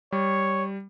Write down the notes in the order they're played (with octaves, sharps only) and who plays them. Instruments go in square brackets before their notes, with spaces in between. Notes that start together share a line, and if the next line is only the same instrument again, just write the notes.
[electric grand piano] G3 [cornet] C#5